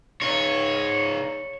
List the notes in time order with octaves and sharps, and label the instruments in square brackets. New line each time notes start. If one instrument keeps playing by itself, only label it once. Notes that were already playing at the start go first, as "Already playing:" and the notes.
[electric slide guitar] D#4 G#4 D5 [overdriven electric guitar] C#5